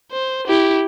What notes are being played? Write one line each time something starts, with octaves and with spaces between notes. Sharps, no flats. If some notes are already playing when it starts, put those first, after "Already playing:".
C5
E4 G4